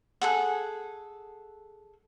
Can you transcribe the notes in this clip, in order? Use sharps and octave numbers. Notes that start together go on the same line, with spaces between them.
G#4 A4 F#5